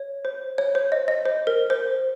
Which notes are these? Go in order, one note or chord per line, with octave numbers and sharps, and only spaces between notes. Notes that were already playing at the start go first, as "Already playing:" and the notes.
Already playing: C#5
C5
C#5
C5
D#5
D#5
C5
A#4
C5